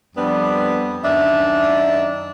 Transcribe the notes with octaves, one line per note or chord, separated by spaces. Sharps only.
F2 G3 B3 C4 D4
F#2 D#3 D4 E5